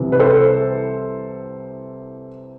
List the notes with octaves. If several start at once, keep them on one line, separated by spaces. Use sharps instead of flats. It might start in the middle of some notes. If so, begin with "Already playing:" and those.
Already playing: C2 C3 E3
B4
A4 C5